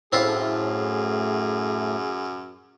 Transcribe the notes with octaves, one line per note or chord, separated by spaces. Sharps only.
F#2 A2 C4 E4 F4 G#4